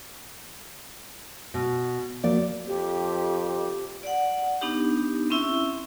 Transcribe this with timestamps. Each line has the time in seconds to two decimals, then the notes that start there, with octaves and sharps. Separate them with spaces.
1.54 B2
2.24 F3 A#3 F#4 D5
2.67 F2 G4
4.03 D5 F#5
4.61 B3 D4 D#4 G4
5.30 C4 C#4 E4 E5 E6